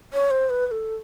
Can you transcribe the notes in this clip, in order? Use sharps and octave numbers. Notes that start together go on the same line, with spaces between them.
C#5
C5
B4
B4
A4